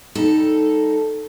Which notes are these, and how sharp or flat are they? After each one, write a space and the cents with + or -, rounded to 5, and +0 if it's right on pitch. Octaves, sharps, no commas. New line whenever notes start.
G3 +0 D#4 +0 A4 +0